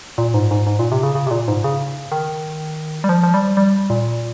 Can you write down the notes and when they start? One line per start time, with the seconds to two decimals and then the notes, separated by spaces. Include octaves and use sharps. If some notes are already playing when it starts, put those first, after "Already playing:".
0.18 A#2
0.34 G#2
0.51 G#2
0.67 G#2
0.79 A#2
0.92 C3
1.03 C#3
1.15 C#3
1.27 C3
1.31 A#2
1.48 G#2
1.64 C#3
2.12 D#3
3.04 G3
3.09 F3
3.23 F3
3.34 G3
3.57 G3
3.90 A#2